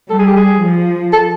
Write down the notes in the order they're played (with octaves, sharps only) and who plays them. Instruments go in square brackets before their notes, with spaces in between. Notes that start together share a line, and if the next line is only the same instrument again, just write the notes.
[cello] G3 [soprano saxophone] A4
[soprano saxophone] G#4
G4
G#4
[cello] F3
[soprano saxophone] A4